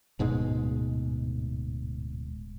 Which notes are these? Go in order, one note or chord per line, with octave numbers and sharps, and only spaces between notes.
D1 G#2 B2 G#3